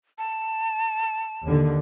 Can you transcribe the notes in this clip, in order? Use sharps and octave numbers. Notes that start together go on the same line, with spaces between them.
A5
D#2 D3